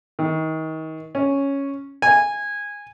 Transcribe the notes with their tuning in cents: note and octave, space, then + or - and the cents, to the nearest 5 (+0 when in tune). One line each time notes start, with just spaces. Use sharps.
D#3 +35
C#4 +0
G#5 -15